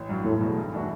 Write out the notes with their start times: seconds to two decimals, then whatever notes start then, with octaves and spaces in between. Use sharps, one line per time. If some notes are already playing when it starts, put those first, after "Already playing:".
Already playing: A1
0.09 G2 F#3
0.25 E1 A2
0.41 E2 B2
0.57 G2
0.73 E3 A3 D4 F#4